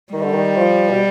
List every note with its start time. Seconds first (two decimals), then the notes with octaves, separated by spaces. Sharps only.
0.13 D#3 G3
0.22 D3
0.33 D#3
0.56 F3
0.89 B2